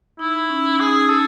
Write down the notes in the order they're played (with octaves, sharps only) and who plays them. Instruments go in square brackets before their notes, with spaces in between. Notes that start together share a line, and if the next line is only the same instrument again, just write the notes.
[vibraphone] D#4 [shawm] E4
[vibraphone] C#4
[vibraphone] D#4 [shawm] G#4
[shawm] A4